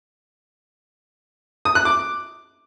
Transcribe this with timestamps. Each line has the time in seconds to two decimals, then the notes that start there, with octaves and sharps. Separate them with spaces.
1.65 D#6
1.75 F#6
1.85 D6